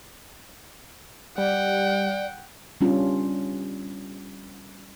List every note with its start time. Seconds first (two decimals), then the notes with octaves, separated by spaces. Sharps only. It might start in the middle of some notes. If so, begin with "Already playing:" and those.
1.38 G3 D5 F#5 G5
2.81 G3 B3 C#4 D4 F4